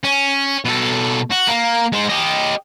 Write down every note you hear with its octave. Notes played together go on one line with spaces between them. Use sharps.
C#4
B2 A4
F#4
A#3
G#3 C5
G4 D#5